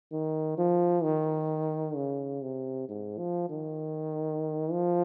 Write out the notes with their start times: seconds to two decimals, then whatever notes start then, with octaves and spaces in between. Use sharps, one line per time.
0.12 D#3
0.58 F3
1.03 D#3
1.95 C#3
2.42 C3
2.89 G#2
3.18 F3
3.50 D#3
4.72 F3